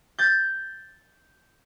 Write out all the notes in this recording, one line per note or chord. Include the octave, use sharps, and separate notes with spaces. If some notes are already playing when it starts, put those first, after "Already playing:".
G6 A6